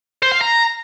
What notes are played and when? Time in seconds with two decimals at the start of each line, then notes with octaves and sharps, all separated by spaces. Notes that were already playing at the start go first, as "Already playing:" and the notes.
0.22 C5
0.32 F5
0.41 A#5